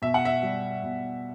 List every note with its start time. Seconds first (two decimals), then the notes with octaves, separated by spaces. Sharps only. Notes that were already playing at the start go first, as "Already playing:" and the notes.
0.02 B2 E5
0.14 F#5
0.25 E5
0.43 G3
0.83 B2